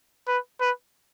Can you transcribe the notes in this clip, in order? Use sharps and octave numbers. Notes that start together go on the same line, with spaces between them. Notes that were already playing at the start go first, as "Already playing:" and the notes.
B4
B4